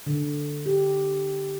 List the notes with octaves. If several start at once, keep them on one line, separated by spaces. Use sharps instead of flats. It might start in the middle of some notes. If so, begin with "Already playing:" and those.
D3
G4